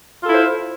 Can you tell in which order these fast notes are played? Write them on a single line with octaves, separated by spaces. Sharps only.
F4 A4 E4 C5